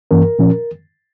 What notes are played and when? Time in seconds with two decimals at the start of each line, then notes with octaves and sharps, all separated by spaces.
0.11 G2 E3 A#3 C#4 A#4
0.39 A#2 F3 C#4